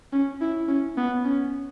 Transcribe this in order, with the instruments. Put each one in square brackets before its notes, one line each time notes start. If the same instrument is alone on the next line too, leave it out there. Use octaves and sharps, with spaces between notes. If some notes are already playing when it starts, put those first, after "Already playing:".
[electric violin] C#4
E4
C#4
B3
C#4